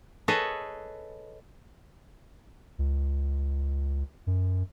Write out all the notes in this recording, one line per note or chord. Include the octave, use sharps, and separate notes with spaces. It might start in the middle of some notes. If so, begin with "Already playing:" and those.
G#4 A4 B4 C#5 D#5
C#2
F#2